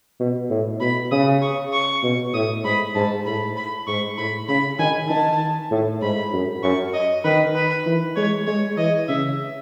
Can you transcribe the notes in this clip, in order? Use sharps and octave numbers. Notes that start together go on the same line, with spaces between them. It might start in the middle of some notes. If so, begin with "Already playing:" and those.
B2
A2
B2 B5
C#3 D#6
C#6
C#6
B2
A2 D#6
G#2 B5
G#2 A5
A2 B5
B5
G#2 C#6
A2 B5
C#3 B5
D#3 G#5
D#3 A5
A2
G#2 B5
F#2
F#2 C#6
D#5
D#3 B4
B4
E3
G#3 C#5
G#3 C#5
E3 D#5
C#3 E5